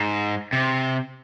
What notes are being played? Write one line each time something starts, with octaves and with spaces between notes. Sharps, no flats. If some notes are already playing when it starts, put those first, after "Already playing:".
Already playing: G#2
C3